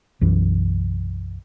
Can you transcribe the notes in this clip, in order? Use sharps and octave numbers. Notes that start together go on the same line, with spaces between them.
B1 F#2 E3